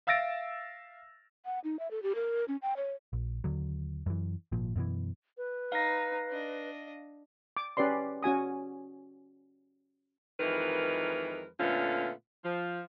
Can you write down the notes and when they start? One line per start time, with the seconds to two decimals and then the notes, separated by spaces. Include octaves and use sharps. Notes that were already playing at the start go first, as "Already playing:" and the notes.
0.07 E5 F5 E6 A6 A#6 D7
1.45 F#5
1.64 D#4
1.79 E5
1.91 A4
2.03 G4
2.15 A#4
2.48 C#4
2.62 G5
2.77 C#5
3.13 A#1
3.44 D#2 D3 F#3
4.06 F#2 E3
4.52 G#1 A#2 F3
4.75 F#2 B2 D#3 E3
5.38 B4
5.72 D#4 F5 A#6
6.30 D4 D#5
7.57 D6
7.77 C#4 G4 B4 D5 C6
8.23 C#4 F#4 G#5 D#6
10.40 F2 D#3 E3 G#3 A#4 B4
11.60 A#2 D3 A3 B3 C#4 F4
12.45 F3